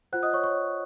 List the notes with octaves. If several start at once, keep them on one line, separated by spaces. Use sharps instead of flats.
F4 C5 F#5 F#6
D#5 D#6
C#5 C#6
C#5 C#6